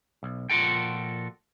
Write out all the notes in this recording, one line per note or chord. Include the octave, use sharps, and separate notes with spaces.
B1
A#2 F3 F4 F#4 A4 G5